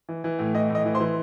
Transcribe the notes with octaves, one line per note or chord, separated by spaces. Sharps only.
E3
E3
A2
E3 D#5
A2
D#5
E3
C5 C6
E3